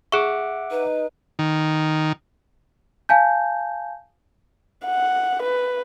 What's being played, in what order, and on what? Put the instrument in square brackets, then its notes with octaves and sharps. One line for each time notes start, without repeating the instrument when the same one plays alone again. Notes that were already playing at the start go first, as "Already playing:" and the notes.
[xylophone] G#4 C#6 [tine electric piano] E5 F#5 D6
[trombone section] D#4 [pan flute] B4
[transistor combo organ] D#3
[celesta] F5 G#5 A5 G6
[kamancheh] F#5
B4